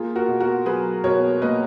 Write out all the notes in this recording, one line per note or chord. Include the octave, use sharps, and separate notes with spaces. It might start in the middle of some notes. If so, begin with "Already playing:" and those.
Already playing: A#3 F4 G#4
F#4 A#4
B2
F#4 A#4
F#3 G#4 B4
B2 A#4 C#5
A#3 B4 D#5